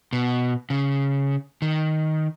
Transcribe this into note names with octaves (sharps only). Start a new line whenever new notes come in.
B2
C#3
D#3